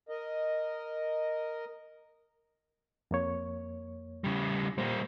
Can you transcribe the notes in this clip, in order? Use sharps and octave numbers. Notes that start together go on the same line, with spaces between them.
A#4 D#5
F2 A#3 C#5
C#3 G3
A#2 G3 A#3 C5